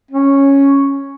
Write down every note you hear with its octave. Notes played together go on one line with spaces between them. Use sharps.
C#4